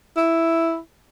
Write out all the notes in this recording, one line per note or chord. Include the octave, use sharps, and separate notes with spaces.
E4